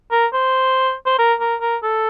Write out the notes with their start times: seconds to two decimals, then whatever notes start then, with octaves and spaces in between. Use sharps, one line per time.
0.11 A#4
0.33 C5
1.06 C5
1.19 A#4
1.40 A#4
1.61 A#4
1.83 A4